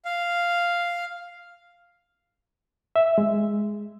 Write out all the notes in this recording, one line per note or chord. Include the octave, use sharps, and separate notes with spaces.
F5
E5
G#3